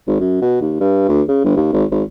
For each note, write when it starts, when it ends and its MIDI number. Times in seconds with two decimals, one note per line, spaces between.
0.08 0.16 32
0.21 0.38 42
0.42 0.60 47
0.61 0.76 39
0.81 1.05 43
1.09 1.22 38
1.29 1.42 49
1.45 1.54 31
1.56 1.69 39
1.73 1.85 32
1.91 2.03 32